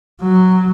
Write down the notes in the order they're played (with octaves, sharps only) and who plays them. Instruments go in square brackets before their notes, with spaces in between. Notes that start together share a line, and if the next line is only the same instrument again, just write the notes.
[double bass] F#3